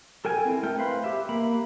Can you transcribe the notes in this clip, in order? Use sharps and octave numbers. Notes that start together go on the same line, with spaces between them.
A4 A#4 G5 G#5
C4 E4
A3 A#4 G5
B4 C5 F5 B5 C6
G4 E5
A#3 B5